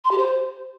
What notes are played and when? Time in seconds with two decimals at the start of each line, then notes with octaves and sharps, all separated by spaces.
0.04 C6
0.11 G4
0.18 C5